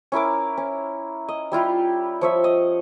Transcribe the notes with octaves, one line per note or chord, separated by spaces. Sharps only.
C#4 E4 A#4 D6
C#4
D#5
G3 E4 F4 G4
F3 C#5 E5
D#5